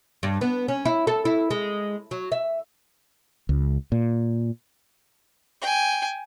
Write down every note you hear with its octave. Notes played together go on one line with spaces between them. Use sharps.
G2
B3
C#4
E4
A4
E4
G#3
F#3
E5
C#2
A#2
G5 G#5